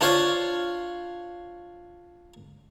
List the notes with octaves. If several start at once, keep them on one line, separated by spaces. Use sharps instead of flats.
D4 F4 C5 C#5 F5